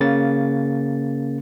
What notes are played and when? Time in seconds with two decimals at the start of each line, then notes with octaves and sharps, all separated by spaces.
0.01 C#3 A#3 A6